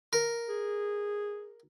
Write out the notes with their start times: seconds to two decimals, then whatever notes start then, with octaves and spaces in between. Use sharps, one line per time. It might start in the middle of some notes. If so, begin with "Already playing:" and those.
0.13 A#4
0.49 G#4